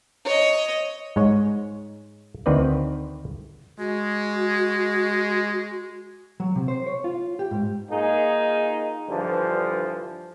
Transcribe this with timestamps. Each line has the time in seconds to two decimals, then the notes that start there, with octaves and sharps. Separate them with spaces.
0.25 C#5 D#5
1.16 G#2 G#3 C#5
2.46 D2 D#3 C4 B4 D5
3.79 G#3 F#4
6.40 F#3
6.56 C3
6.68 C5
6.86 C#5
7.04 F4
7.39 G4
7.51 G#2
7.91 A#3 D#4 F4 G#4
9.08 G2 D3 E3 F3